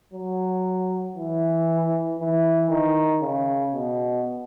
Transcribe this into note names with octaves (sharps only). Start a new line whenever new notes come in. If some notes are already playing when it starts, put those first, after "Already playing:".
F#3
E3
E3
D#3
C#3
B2